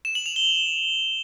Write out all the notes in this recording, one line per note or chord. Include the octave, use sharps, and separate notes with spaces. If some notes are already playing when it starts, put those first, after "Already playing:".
E7
F#7
F7
G7